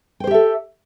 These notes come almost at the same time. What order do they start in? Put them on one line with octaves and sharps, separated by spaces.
G5 C5 G4 E5 A4